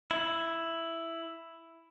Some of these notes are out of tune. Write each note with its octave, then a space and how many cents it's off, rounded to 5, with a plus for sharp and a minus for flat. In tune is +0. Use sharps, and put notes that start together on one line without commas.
E4 +5